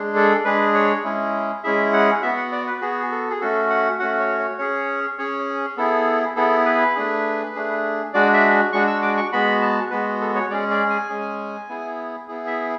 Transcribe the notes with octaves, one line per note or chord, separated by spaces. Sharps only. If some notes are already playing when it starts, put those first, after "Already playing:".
Already playing: G#3 D4 G#4
A4
G#3 D4 G#4 B4
C#5
G#3 C#4 E4 G#4
G#3 C#4 E4 G#4 E5
F#5
B3 F#4 E5
F#5
D5
B4
B3 F#4 G#4
A4
G#4
A3 C#4 F#4 A4
F#5
A3 C#4 F#4 F#5
C#5
C#5
C#4 G#4 C#5
C#4 G#4 C#5
B3 E4 G#4 A4
B3 E4 G#4 A4
B4
A3 D4 G#4
A3 D4 G#4
G#3 D4 F#4 D5
E5
G#3 D4 F#4 C#6
E6
D6
C#6
G#3 B3 F#4 B5
A5
G#3 B3 F#4 B4
A4
C#5
G#3 C#4 G#4 D5
D5
G#5
G#3 C#4 G#4
B3 E4 G#4
B3 E4 G#4
E5